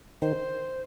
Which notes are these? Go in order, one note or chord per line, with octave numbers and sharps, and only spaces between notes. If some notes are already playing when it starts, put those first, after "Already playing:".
D#3 C5